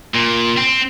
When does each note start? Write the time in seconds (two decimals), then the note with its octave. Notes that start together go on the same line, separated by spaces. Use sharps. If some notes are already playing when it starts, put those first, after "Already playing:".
0.14 A#2
0.57 C4